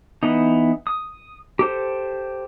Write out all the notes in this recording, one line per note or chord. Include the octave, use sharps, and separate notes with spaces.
E3 B3 D#4
D#6
G4 A4 C5